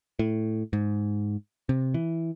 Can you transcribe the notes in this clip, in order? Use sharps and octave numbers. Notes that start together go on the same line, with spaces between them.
A2
G#2
C3
E3